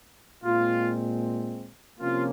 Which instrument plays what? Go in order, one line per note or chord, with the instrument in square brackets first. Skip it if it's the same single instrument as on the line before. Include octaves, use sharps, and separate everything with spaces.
[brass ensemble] A#2 G#3 C4 F4
C3 F3 A#3 C#4 F4